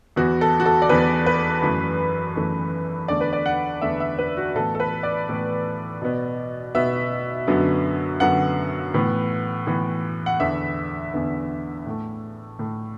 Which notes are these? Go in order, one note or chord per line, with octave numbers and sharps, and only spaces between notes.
E2 E3 B3 F#4
A4
F#4
A4
D5
E2 E3 B3 B4
B4
F#2 E3 A3
F#2 E3 A3
E2 D3 A3 D5
B4
D5
F#5
E2 D3 A3 E5
E5
B4
F#4
A2 E3 B3 A4
A4
B4
D5
A2 E3 B3
B2 B3
B2 B3 E5
F#2 D3 F#3 B3
F#2 D3 F#3 B3 F#5
A2 E3 B3
A2 E3 B3
F#5
E2 D3 B3 E5
E2 D3 B3
A2 A3
A2 A3